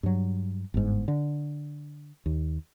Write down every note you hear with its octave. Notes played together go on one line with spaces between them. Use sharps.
G2 F#3
G1 G#2
D3
D#2